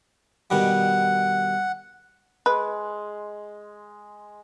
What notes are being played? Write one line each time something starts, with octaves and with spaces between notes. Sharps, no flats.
B2 D#3 G3 F#5
G#3 B4